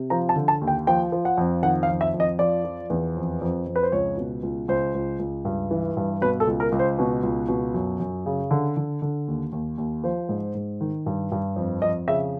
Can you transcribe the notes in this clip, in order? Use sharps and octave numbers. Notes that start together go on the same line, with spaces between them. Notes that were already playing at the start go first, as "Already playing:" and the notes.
Already playing: C3
F3 A#5
A5
D3
A5
D#2
G5
F3 G5
F3
F#5
F2
D#3 F#5
F5
F2
E5
F2
D#5
F3 D5
F3
E2
F2
F2
F2
B4
C5
C#2 C#5
B2
C#2
C#2 C5
C#2
C#2
G2
E3
G2
B2 B4
A4
C#2
A#4
C#2
C5
B2
C#2
B2
F#2
F#2
C#3
D3
D3
D3
D#2
D#2
D#2
F3 C5
G#2
G#2
D#3
G2
G2
F2
F2 D#5
C#3 E5